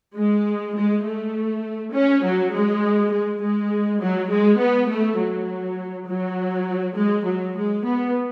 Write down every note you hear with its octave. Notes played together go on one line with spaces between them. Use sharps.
G#3
G#3
A3
C#4
F#3
G#3
G#3
G#3
F#3
G#3
B3
A3
F#3
F#3
G#3
F#3
G#3
B3